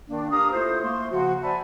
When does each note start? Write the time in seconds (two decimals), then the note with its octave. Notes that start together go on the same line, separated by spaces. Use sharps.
0.08 D#3 A#3 D4
0.31 G4 A#4 F5 A#5 D#6
0.52 A3 E4 F4 A4 C5
0.83 A3 A#3 C6
1.11 C#3 F3 F#4
1.43 C5 D5 E5 G#5 A5 B5